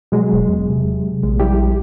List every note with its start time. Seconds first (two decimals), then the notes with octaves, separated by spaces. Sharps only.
0.12 B2 F#3 G#3
0.33 E1
0.48 E2
0.69 C3
1.23 A#1 A#2 G#3
1.40 G3 E4 G4